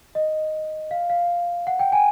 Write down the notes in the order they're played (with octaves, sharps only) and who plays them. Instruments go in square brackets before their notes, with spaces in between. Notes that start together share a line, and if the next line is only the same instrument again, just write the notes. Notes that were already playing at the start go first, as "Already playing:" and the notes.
[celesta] D#5
F5
F5
F#5
G5
G#5